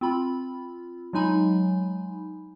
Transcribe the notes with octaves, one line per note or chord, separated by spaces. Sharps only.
C4 F4 B5
F#3 G#3 D#4 G#5 B5